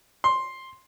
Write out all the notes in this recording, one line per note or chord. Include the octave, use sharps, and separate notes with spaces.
C6